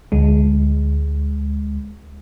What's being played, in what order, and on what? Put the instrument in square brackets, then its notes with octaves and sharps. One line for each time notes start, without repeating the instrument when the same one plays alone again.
[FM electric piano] D2 G#3